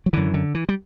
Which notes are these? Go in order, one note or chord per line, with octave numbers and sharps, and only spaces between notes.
F#3
F#2 D3 E3
D3
E3
G3